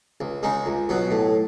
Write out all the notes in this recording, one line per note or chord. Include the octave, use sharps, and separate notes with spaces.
C#2
C#3 G#3 D#4
C#2
B2 F#3 B3
A2